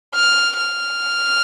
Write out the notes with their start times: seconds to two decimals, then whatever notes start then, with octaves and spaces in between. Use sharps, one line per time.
0.15 F6
0.57 F6